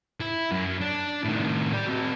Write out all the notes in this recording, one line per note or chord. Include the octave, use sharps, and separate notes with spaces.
E4
F#2
D4
A2 D#3
G4 D5
C4 F#4